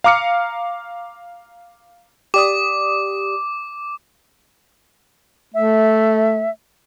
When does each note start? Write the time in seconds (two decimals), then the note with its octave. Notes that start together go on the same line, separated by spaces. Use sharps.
0.04 F5 A#5 D6 F6 C#7
2.34 G4 D5 D6 D#6
5.54 A3 E5